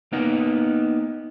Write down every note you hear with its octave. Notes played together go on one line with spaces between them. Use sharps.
A#3 B3 D#4